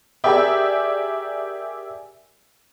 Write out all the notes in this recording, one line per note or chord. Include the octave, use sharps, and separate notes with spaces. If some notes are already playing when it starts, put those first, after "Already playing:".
G4 G#4 A#4 D5 E5 G5